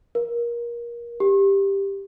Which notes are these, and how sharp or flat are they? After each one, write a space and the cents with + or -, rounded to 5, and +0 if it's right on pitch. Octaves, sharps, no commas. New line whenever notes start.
A#4 +25
G4 +10